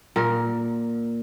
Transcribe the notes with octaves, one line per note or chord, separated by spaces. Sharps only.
A#2 A#4